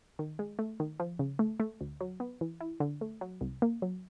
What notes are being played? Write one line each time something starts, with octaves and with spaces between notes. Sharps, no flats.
D#3
G#3
A3
D#3
F3
C#3
A3
A3
D2
F#3
B3
E3
E4
D3
A3
F#3
C2
A#3
F#3